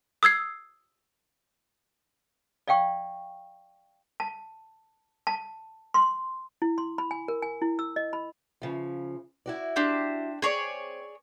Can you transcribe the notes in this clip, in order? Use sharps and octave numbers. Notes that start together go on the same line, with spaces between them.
D#6 E6 G#6 C7
D5 E5 F5 G5 C#6
A5
A5
C6
E4
C6
B5
G#5
A#4
G#5
E4
E6
D#5
B5
C#3 F3
E4 F#4 D5
D4 G4 C5
C4 G#4 C#5 D5